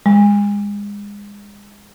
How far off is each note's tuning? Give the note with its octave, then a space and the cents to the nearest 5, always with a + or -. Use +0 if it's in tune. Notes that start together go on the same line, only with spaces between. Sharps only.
G#3 -30